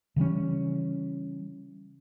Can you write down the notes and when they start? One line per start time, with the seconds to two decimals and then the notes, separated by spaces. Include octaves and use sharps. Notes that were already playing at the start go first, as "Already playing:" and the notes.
0.16 C#3 E3 G3 C#4